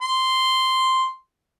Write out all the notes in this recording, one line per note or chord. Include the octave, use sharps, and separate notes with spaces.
C6